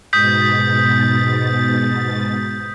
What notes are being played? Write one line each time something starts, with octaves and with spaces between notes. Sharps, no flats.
G#2 B2 D#6 G6 A6 B6